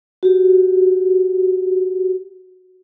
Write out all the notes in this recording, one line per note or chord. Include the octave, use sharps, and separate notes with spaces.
F#4 G4